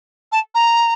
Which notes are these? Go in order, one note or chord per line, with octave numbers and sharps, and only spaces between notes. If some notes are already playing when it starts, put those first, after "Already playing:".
A5
A#5